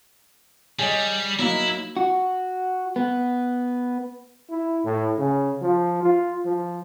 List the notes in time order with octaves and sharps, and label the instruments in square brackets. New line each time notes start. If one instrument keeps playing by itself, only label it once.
[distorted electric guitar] G3 [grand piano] G#4 C#5 D#5
[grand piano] F#3 A#3 D#4 [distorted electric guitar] E4
[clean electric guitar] F#4
B3
[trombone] E4
A2
C#3
F3
F4
F3